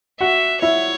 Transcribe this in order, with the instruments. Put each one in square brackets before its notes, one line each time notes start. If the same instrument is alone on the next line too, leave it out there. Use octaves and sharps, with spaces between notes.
[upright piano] F#4 F#5 [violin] E5
[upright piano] E4 E5 [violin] C#5